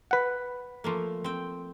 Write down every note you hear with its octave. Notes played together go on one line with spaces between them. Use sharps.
B4 F#5
F3 A3 A#3
C4 G5